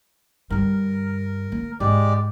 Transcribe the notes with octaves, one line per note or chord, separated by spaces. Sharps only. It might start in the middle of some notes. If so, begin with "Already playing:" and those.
G2 D3 A#4
A#3
G#2 G#3 G4 D5